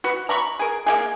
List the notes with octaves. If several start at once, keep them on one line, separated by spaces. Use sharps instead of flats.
F#4 B4
A#5 B5 C#6
G#4 A#4
A#3 D#4 G#4